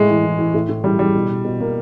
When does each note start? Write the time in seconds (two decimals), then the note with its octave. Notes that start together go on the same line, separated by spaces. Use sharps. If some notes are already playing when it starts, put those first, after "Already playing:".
Already playing: A2 G#3
0.09 E3
0.24 E3
0.39 E3
0.54 A2
0.69 A2
0.84 E3 G3
0.99 E3 G3
1.15 B2
1.30 B2
1.45 B2
1.60 B2 A#3